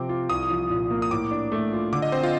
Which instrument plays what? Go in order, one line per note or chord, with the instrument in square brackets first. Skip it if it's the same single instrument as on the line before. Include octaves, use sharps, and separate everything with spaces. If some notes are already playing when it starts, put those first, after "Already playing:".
Already playing: [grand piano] C3 F3 C4 [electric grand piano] D6
[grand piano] F4
[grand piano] C2 [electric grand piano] D#6
[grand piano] F3
A#2
A#3
[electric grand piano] D#6
[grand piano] A2 [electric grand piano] D6
[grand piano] D4
A3
F4
[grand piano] D3 [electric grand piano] D6
[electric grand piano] D#5
[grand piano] C4 [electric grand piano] C5
[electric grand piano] F4